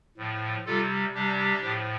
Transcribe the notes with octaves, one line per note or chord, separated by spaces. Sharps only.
A2 F3
C3 G3 F4 A4
C3 G3 D4 G4
A2 F3